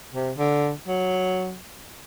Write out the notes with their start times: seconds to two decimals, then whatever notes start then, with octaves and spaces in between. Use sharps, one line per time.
0.14 C3
0.38 D3
0.88 F#3